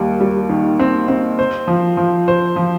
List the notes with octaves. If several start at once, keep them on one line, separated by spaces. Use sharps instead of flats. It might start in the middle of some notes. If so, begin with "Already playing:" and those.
Already playing: D#2 G3
G3
D#3
C4
C4
C5
F3
F3
C5
F3